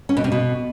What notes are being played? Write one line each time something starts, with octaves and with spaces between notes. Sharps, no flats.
C#4
B2
C3
B2